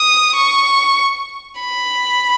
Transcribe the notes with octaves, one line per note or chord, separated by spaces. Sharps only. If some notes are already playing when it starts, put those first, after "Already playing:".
Already playing: D#6
C#6
B5